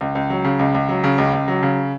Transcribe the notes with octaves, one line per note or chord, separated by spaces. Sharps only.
C#2
C#2
F#3
C#3
C#2
C#2
F#3
C#3
C#2
C#2
F#3
C#3